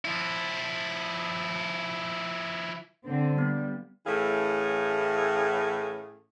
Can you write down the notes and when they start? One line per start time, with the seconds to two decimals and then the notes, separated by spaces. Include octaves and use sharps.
0.05 F3 E4
3.06 D3 C4
3.38 G3 B3
4.06 A2 E3 A3 C#4 G#4 F5